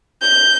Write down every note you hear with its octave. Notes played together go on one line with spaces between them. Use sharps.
G6